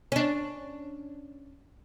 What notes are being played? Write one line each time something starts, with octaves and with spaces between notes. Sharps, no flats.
C#4 D4